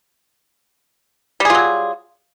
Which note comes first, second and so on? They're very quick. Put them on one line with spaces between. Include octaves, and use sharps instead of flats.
G3 G#4 F4 F#3